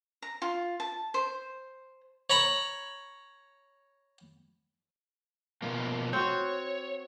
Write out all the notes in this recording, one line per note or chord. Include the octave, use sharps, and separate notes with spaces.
A#5
F4
A5
C5
C#5 A#5 B5
B2 F3 A#3
C4 F#4 C#5